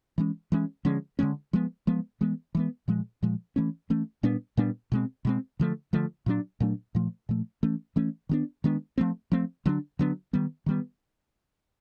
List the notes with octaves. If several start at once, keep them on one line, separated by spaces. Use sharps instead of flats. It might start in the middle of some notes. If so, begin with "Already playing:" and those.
E3 G#3 C#4
E3 G#3 C#4
D3 F3 G#3 C#4
D3 F3 G#3 C#4
F3 G#3 B3
F3 G#3 B3
E3 G#3 B3
E3 G#3 B3
A#2 F3 G#3
A#2 F3 G#3
E3 A3 C#4
E3 A3 C#4
A#2 G3 B3 D4
A#2 G3 B3 D4
B2 G#3 C4
B2 G#3 C4
D3 F3 A3
D3 F3 A3
A#2 F#3 A3 D4
A#2 F#3 A3 D4
A#2 F3 A3
A#2 F3 A3
E3 A3 C#4
E3 A3 C#4
D#3 G#3 B3 D4
D#3 G#3 B3 D4
F3 A3 C4
F3 A3 C4
D3 F#3 B3 D4
D3 F#3 B3 D4
D#3 G3 B3
D#3 G3 B3